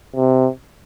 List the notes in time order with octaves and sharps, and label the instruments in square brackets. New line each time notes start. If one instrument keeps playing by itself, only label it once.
[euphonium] C3